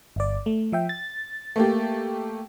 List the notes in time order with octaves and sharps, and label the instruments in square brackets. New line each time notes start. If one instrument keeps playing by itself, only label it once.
[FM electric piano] G1 D5
A3
F3 E5 G5
A6
[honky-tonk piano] A3 A#3 G4